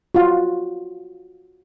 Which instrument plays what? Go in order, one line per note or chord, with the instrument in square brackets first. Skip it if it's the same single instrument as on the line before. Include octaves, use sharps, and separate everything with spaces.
[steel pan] F4 F#4